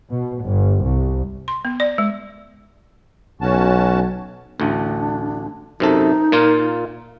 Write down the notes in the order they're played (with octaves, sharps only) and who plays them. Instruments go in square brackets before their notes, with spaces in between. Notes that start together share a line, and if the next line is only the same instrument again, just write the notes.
[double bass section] B2
G1
C2
[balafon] C6
B3
D5
G#3
[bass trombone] B1 [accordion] C#4 F#4 A5
[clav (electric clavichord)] A1 D2 [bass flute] D4
[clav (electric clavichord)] F#2 C3 A4 [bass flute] D#4
[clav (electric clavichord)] A#2 A#3 F4